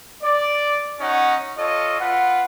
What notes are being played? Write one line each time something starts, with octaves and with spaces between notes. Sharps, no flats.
D5
C#4 D#4 F#4 F#5
F4 A4 C#5 D#5
F4 B4 F#5